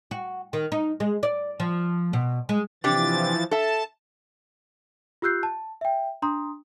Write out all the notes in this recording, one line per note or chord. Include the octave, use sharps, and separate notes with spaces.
F#4
D#3
D#4
G#3
D5
F3
B2
G#3
C3 E3 F3 D4 G4 A6
A4 E5 A5
F4 G4 E6 F#6 G6 C7
A5
E5 G5
D4 A#5 C6 D#6